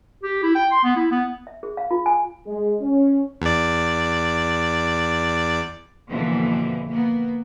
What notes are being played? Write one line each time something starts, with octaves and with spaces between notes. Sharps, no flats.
G4
E4
G5
C6
B3
E4
B3
E5
G#4
F5
F4
G#5
G#3
C#4
E2 D5
F2 B2 D3 E3 A#3
A#3 B3